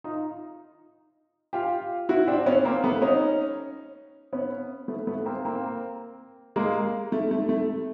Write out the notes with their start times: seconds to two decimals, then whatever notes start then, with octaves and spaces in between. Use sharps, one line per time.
0.04 D#4 F4
1.53 F4 G4
2.09 E4 F#4
2.28 C4 D4
2.46 B3 C#4
2.65 A#3 C4
2.84 A3 B3
3.02 C#4 D#4
4.33 B3 C#4
4.88 A3 B3
5.07 A3 B3
5.26 A#3 C4
5.45 A#3 C4
6.56 G#3 A#3
7.12 A3
7.31 A3
7.49 A3